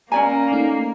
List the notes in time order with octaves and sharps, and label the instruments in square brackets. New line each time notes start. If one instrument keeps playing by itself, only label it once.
[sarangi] A#3 [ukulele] C#4 D5 G#5 [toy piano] A#5
[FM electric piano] A3 D#4 C7